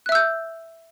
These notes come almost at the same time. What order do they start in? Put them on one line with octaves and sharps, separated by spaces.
F#6 E5 E6 G6